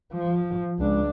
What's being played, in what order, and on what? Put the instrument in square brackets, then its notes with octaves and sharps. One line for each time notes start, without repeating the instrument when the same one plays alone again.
[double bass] F3
C#2 D4